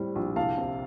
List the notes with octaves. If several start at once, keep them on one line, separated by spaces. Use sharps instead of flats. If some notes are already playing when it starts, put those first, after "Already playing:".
Already playing: A2 G3 C4
A#1
C2 F5 A5
C3